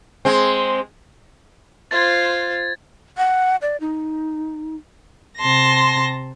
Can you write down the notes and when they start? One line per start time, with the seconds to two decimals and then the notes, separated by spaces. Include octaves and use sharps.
0.25 G#3 C4
1.91 F4 C5 G#6 A6
3.18 F#5
3.62 D5
3.81 D#4
5.39 C3 A5 C6 A#6